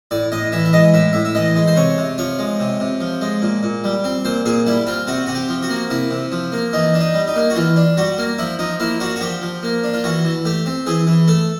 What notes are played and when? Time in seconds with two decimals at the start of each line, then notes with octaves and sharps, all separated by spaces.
0.11 A2 D5
0.32 A2 D#5
0.52 E3 E5
0.65 E5
0.73 G#3 D#5
0.94 A2 E5
1.13 A2 E5
1.25 E5
1.35 E3 D#5
1.56 G#3
1.67 C5
1.76 C3 C#5
1.98 C3
2.18 F3 C#5
2.39 G#3
2.60 C3
2.80 C3
3.01 F3
3.21 G#3
3.42 A#2
3.63 A#2
3.84 G3
4.04 C4
4.25 A#2 C5
4.45 A#2 G#4
4.66 G3 E4
4.87 C4 F4
5.07 C3 F#4
5.26 C3 F#4
5.35 G4
5.49 F3
5.63 F#4
5.70 A#3
5.90 C3 E4
6.11 C3
6.32 F3
6.52 A#3
6.73 E3 D#4
6.94 D4
7.01 D#4
7.14 G3
7.28 D#4
7.36 A#3
7.50 F#4
7.56 E3 F4
7.76 D4
7.97 G3 F#4
8.18 A#3
8.38 F3 E4
8.59 F3 D#4
8.80 A#3 E4
9.00 D4 F#4
9.16 F#4
9.21 F3 G4
9.42 F3
9.63 A#3
9.84 D4
9.93 F4
10.04 E3 F#4
10.25 E3
10.45 A3 G4
10.66 C4
10.86 E3 G#4
11.07 E3
11.28 A3 A4